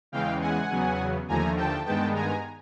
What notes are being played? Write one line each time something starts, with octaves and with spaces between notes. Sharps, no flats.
E2 C#3 E3 G#3 F5 G5
F#5 G#5
E2 C#3 F#3 B3
D#2 D3 F3 A3 G#5 A#5
G5 A5
G2 D#3 G#3 B3 G5 A5
G#5 A#5